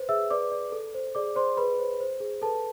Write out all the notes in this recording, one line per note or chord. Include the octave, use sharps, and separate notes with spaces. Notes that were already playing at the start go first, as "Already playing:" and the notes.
Already playing: B4 C5
G#4 E5 E6
B4 D5 D6
D5
A4
C5
G#4 D5 D6
C5 D5 C6
G#4 B4 B5
C5
C5
G#4
A4 B4 A5